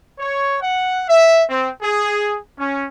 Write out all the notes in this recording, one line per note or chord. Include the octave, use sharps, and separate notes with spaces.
C#5
F#5
E5
C4
G#4
C#4